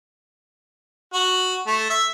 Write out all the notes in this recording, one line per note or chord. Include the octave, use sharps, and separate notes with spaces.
F#4
A3
E5